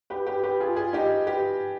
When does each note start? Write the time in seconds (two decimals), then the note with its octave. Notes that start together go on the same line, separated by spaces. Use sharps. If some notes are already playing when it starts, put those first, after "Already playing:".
0.10 G4 B4
0.27 G4 B4
0.43 G4 B4
0.60 F4 G#4
0.76 F4 G#4
0.93 D#4 G4
1.26 G4 B4